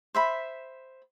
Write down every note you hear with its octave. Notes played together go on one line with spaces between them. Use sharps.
C5 E5 B5